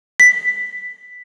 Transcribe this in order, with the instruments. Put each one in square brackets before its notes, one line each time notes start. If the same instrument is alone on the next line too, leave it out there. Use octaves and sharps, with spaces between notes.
[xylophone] B6